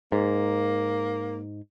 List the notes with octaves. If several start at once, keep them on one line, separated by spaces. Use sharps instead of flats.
G#2 A#3